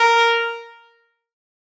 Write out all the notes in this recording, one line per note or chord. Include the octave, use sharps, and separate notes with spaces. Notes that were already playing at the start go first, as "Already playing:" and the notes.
Already playing: A#4